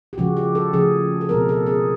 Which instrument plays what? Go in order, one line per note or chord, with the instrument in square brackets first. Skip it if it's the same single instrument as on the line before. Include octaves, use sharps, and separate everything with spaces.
[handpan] G4
C#3 F3 G#3 F#4
G4
A4
C#3 F3 A3 G#4
A4
B2 G#3 C4 A#4
A4
G#4